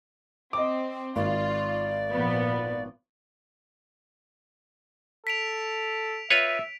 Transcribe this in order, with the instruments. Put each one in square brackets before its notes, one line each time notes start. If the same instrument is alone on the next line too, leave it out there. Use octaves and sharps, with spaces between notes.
[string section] C4 [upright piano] D#5 D6
[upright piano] G#1 [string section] F4 [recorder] D5
[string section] A#2 F3 B3
[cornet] A4 [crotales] B6 D7 F7
[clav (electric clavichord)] F4 B4 C#5 [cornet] E5